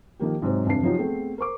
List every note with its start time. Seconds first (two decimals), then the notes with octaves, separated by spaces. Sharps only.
0.19 D#3 F3 A#3 G4
0.42 G#2 C3 F#3 D#4 C5
0.66 E1 G2 C3 D4 A5 C7
0.83 F3 F#3 C#4 D#4 F4 G4
0.98 A3 B3 C4 G#4 A4
1.38 A#4 C5 C#6 D6